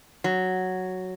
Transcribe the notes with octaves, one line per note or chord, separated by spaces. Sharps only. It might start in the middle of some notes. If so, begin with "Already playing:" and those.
F#3